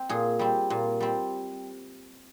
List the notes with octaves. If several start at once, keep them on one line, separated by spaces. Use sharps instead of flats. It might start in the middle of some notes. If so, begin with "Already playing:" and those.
Already playing: C4
A#2 G#4
G3 C4
A#2
G3 C4